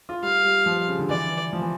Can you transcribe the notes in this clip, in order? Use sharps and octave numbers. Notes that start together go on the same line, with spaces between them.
F4
G3 F5
G3
F3
C#3
D3
E3 D5
F3
E3